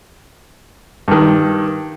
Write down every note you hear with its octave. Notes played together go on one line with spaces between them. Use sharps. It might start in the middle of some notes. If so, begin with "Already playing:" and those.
G2 D#3